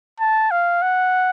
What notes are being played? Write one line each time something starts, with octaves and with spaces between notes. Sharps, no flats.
A5
F5
F#5